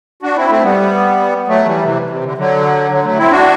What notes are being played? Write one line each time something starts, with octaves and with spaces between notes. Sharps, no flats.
D4 F#4
C4 E4
A3 C4
G3 B3
F#3 A3
E3 G3
C3 E3
C3
D3
D3 F#3
D3 F#3
F#3 A3
C4 E4
D4 F#4